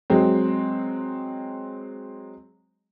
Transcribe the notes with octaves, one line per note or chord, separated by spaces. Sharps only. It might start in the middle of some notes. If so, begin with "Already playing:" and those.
F#3 G#3 C4